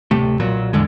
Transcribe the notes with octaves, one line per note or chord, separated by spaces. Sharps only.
D1 C3 A3
B1 A#2 F#3
A1 E2 D3 G#3